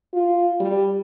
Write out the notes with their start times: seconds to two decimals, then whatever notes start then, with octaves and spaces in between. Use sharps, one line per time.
0.13 F4
0.60 G3